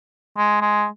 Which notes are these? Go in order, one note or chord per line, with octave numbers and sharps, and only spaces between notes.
G#3
G#3